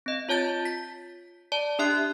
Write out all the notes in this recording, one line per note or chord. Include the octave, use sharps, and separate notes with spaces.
C4 D#5
F4 C#5 A5 G6 A6
B6
D5 A5
D4 G4 E5 F#6 C7